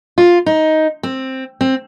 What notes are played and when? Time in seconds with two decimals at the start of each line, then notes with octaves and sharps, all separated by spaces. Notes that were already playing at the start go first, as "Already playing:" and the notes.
0.18 F4
0.46 D#4
1.03 C4
1.61 C4